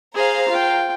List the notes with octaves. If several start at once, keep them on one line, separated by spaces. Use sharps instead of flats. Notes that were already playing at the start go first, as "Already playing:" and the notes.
G#4 C5 F5 A#5
F4 G5